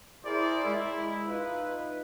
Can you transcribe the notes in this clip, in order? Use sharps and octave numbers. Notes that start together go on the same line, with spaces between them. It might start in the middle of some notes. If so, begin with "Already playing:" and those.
E4 G#4 A#4 C5 D5
G#3 E4
D#4 F4 B4